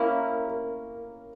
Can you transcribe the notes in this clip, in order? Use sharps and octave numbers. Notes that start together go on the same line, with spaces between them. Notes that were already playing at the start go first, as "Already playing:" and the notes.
Already playing: A#3 C#4 E4 A#4
A#4